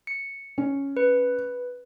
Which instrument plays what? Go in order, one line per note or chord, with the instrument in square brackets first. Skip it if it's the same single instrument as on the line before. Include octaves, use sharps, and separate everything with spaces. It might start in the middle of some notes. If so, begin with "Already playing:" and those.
[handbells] C#7
[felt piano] C#4
[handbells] B4